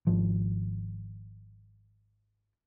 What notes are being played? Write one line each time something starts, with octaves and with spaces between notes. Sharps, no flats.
G#1 F3